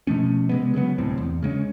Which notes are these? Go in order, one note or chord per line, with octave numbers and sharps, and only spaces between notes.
B2 F3 A3 C#4
C3 G#3 B3
C#3 F#3 G3 B3
D1 C2 A2 C4
E2
C#3 G#3 B3 C#4